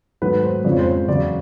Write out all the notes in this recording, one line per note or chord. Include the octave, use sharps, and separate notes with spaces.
G#2 D#3 F#3 A3 B4
C5
F2 C#3 F3 G#3 C4 D5
C#5
C5
C#5
E2 C#3 F#3 D5